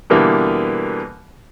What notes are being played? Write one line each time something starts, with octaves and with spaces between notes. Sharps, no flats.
B2 D3 E3 G3 A#3